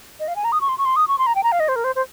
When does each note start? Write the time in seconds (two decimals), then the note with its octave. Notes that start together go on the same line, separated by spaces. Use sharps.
0.20 D#5
0.28 F5
0.36 G#5
0.44 A#5
0.52 D#6
0.61 C#6
0.69 C6
0.78 C#6
0.85 C6
0.96 D#6
1.08 C#6
1.18 C6
1.27 A#5
1.35 G5
1.43 A#5
1.52 F5
1.60 D#5
1.69 C5
1.76 A#4
1.84 C5
1.96 C5